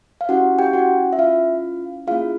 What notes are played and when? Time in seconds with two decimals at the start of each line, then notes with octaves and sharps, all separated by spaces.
0.21 F5
0.29 C#4 E4 F#4 G4 F#5
0.59 G4 G5
0.73 F#4 F#5
1.13 E5
1.19 F4 F5
2.07 A#3 C#4 E4 F4 G#4 F5